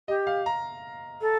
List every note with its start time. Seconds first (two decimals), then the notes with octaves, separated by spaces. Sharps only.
0.08 G4 D#5
0.27 F5
0.46 A#5
1.21 A4